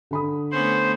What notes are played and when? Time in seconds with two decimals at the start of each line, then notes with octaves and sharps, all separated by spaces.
0.11 D3 B5 D#6
0.52 A3 B3 C#4 C5